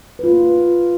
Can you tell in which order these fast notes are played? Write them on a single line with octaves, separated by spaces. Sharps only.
B4 F4 A#3